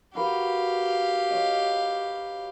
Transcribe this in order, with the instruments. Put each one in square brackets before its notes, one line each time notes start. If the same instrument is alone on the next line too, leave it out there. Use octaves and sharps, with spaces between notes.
[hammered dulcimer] F#4 A#4 B4 [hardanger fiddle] G4 F5
[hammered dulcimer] C#5 D#5